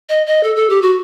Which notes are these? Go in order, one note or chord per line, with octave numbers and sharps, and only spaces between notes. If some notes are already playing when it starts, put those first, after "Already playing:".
D#5
D#5
A4
A4
G4
F#4